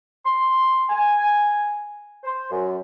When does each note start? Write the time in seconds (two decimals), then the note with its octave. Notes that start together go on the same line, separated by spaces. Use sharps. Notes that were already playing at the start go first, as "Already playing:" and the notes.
0.25 C6
0.89 G#5
2.23 C5
2.51 F#2